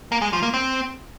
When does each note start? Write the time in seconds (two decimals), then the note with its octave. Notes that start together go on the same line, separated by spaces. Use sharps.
0.12 A#3
0.22 G#3
0.33 F3
0.43 A#3
0.54 C4